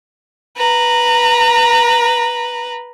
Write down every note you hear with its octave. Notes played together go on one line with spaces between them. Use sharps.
B4 A#5